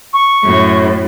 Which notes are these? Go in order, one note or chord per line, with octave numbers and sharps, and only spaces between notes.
C#6
F#2 A2